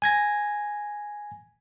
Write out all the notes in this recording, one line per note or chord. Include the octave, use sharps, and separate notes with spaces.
G#5 G#6 A#6